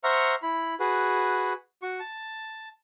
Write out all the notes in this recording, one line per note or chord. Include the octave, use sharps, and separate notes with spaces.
C5 E5 F#5 A#5 C#6 F6
E4 B5
F#4 G#4 B4
F#4 C#6
A5